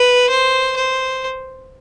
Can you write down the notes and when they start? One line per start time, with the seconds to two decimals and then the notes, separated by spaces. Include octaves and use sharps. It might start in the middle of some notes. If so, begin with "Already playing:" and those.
Already playing: B4
0.29 C5
0.76 C5